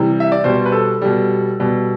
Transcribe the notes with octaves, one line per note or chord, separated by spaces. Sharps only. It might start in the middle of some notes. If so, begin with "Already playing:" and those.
Already playing: C3 E3 G3
E5
D5
B2 G3 C5
B4
A4
B2 G3
B2 G3